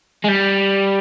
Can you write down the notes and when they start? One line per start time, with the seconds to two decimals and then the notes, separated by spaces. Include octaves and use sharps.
0.24 G#3
0.29 G3